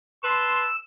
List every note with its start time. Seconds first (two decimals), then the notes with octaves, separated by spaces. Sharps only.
0.23 B4 A5 C6 E6